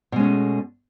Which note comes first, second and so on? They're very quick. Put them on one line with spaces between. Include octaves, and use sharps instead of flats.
B2 G#3 C#4 A3